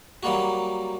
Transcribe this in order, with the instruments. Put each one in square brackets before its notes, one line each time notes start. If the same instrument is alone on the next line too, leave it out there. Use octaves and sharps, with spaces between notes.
[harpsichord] F#3 G3 A#3 F#4